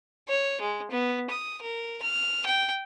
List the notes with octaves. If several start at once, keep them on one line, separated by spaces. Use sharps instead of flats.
C#5
G#3
B3
D#6
A#4
F6
G5